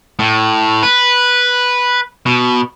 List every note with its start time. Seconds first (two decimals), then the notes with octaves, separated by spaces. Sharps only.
0.19 A2
0.83 B4
2.26 B2